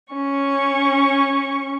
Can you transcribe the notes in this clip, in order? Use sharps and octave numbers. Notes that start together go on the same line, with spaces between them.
C#4 C#6